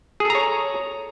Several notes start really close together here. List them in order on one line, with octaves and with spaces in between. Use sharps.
G#4 A4 A#5 C#5